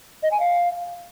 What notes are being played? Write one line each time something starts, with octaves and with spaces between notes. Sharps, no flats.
D#5
G#5
F5